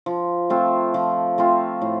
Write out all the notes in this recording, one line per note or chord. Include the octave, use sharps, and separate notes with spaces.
F3
A3 C4 F4
F3
A3 C4 F4
A2